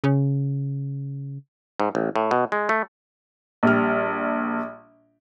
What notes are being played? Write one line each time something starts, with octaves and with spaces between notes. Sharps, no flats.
C#3
G#2
A1
A2
B2
G#3
A3
A#1 G3 F6